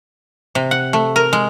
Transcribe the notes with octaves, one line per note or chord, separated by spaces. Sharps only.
C3
F#5
A3
A#4
G#3